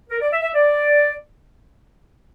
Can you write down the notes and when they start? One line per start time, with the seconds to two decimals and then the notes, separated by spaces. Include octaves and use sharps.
0.10 A#4
0.21 D5
0.32 E5
0.42 E5
0.54 D5